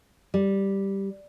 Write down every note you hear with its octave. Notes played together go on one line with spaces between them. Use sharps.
G3